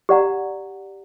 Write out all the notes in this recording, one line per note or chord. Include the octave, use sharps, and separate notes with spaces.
G4 D5 F#5 A#5